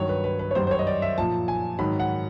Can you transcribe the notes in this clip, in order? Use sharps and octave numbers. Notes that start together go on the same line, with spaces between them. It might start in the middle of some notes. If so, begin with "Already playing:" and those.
Already playing: G2 D#3 F#3 C#5
B4
B4
B4
C#5
F#2 D#3 G3 C5
C5
C#5
D#5
D5
E5
A#2 F3 A5
G#5
G#2 D#3 F#3 B5
F#5